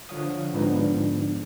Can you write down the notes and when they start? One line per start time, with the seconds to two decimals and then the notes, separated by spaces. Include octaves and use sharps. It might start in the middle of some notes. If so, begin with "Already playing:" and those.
0.09 D3 F3 C#5 F5 F#5 D#6
0.53 G#2 D3 F3 B3 D4 D#4